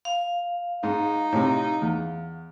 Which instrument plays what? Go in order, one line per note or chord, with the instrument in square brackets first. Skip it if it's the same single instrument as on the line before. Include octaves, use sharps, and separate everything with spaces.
[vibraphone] F5
[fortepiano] G#2 [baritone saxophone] D#4
[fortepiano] A2 C3
E2